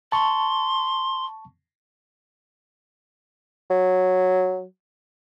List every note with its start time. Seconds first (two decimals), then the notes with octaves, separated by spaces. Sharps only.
0.12 A5 C6 C#6
3.70 F#3